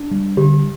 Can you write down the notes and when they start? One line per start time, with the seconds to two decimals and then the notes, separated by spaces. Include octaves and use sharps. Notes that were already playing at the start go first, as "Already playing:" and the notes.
Already playing: D4
0.11 G3
0.37 D3 G4